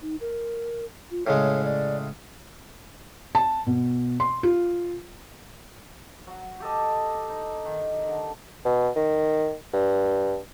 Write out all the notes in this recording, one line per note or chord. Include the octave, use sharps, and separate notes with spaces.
D#4
A#4
F4
A2 C#3 G#3 C#5
D5
A5
B2
C6
F4
F#3
G4 A4 D#5
D#4
D#3
D3
B2
D#3
G2